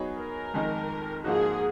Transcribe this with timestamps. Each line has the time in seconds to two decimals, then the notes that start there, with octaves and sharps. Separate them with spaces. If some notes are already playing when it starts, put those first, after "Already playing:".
Already playing: F#3 B3 D#4 G#4 C#5
0.19 A#4
0.54 F2 D#3 G#3 D#4
1.24 G#2 F3 A#3 D#4 F#4 G#4